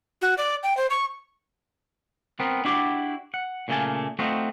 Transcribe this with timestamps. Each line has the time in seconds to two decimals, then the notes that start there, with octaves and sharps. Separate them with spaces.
0.22 F#4
0.38 D5
0.63 G5
0.77 C5
0.90 C#6
2.40 B3 C4 A#4
2.65 D4 E4 F#4 G4 D5
3.34 F#5
3.68 A#2 C#3 A3 A#3 G#5 A5
4.19 A3 C4 D#4 F4 F#4